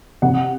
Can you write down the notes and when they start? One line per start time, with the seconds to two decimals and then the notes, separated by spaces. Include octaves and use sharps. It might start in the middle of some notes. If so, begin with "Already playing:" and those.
0.22 C3 F#5